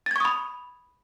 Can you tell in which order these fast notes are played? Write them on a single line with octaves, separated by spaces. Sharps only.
A6 G#6 C#6 D#6 B5